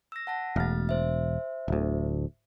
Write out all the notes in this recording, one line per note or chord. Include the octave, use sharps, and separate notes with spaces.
E6 A#6
F#5 A5 A#6
E1 A3 F6 A6
C5 E5
D1 D2